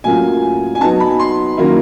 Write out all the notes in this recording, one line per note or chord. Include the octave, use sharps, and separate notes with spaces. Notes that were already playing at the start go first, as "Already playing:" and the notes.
A2 F#3 A#3 C#4 F4 G#5
G#5
F#3 B3 D#4 A5
B5
C6
D#3 F#3 A#3 C#4 E4